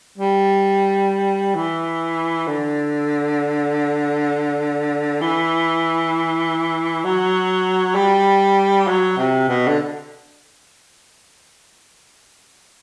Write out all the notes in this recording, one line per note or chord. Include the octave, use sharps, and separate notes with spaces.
G3
E3
D3
E3
F#3
G3
F#3
C3
B2
D3